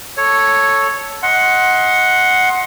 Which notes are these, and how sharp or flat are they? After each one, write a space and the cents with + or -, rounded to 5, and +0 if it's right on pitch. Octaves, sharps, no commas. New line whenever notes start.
A4 +0 C#5 +0
D#5 +25 F#5 +0 C6 +20